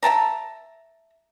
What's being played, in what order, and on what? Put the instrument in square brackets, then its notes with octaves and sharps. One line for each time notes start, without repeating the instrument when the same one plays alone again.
[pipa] E5 G5 A5 A#5